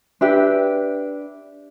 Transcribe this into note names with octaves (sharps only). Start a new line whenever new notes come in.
D4 G4 B4 E5